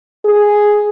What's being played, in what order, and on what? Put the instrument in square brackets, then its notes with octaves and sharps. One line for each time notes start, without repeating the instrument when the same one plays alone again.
[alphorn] G#4